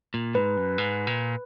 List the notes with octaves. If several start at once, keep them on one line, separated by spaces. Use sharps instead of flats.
A#2
G#2 B4
F#2
G#2
A#2